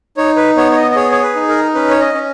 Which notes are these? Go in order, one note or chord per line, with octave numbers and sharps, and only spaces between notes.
D#4 C#5
B4
B3 C#5
C#5
D#5
D#5
G#4 C#5
C#5
B4
D#4
A#4
C#4 B4
C#5
D#5
C#4